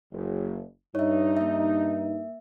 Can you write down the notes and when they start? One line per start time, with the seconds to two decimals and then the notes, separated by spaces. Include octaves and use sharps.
0.12 F#1
0.95 G2 D#4 C#5 E5
1.37 A#3 E5